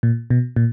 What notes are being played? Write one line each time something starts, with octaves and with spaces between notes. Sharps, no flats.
A#2
B2
A#2